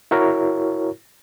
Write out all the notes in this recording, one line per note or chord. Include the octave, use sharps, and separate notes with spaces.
E4 F#4 A#4 C#5